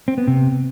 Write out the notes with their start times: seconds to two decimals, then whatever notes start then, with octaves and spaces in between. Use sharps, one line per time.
0.08 C4
0.18 B3
0.28 C3